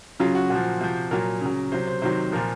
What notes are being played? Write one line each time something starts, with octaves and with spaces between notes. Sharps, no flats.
C#3 F#3 F4
F#4
A#2 F#4
F3
C3 F3
A#2 F#3 A#4
C#3 F#3
C3 F#3 C5
C5
C3 D#3 F#3 C5
A#2 F3 A#4